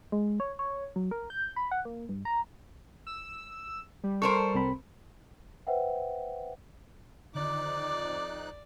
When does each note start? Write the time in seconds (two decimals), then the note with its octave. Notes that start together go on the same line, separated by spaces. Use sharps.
0.12 G#3
0.40 C#5
0.59 C#5
0.96 F#3
1.11 A#4
1.30 G6
1.56 B5
1.71 F#5
1.85 A#3
2.09 G2
2.25 A#5
3.07 E6
4.04 G3
4.22 A4 A#4 C5 C#6
4.54 C2 C4 B5
5.67 B4 C5 E5 F#5 G5
7.35 F2 D3 D#3 D#4 D5 D6 F#6